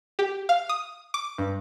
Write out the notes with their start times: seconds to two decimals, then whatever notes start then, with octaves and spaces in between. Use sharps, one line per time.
0.19 G4
0.49 F5
0.69 D#6
1.14 D6
1.38 G2